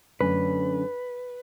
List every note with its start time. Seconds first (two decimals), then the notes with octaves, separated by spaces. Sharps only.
0.21 F#2 D3 A3 C#4 B4